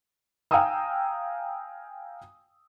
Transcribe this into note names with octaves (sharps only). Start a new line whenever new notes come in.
F5 G5 G#5 A#5 D#6 E6